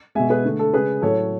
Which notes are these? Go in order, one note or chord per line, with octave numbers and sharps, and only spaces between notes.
B2 G#3 E5 G#5
G#4 B4
D3 A3
A4
C#3 G#3 G#4 B4
A2 F#3 A3 A4 C#5